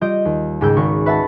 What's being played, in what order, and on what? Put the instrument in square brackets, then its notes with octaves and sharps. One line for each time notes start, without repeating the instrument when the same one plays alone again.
[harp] G3 F4 D#5 G6 D7
D#2
C#2 G#2 G5 E6 G6
G#1 C#6
B4 E5 F#5 A5